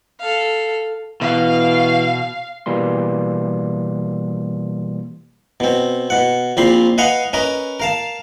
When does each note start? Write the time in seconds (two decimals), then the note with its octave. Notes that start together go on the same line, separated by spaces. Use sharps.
0.20 A4 F5
1.21 B2 E3 F5
2.66 B2 E3 G3 A#3 C6
5.60 B2 C4
6.10 B2 F#5
6.57 A#1 A#2 C4 B5 C6
6.98 B4 D#5 F5 F#5 G#5
7.33 C#4 A#4 B4 D#5
7.80 A#4 F5 A5